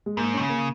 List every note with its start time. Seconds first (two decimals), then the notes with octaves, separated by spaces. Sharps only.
0.06 G#3
0.17 G#2 A#3
0.33 D#3 C#4
0.42 C#3
0.49 A#3